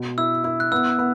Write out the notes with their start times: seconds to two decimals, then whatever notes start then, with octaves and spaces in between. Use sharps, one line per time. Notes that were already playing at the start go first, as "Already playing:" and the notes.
Already playing: B2
0.18 E4 E6
0.44 E4
0.60 F#6
0.72 B3 E6
0.99 B3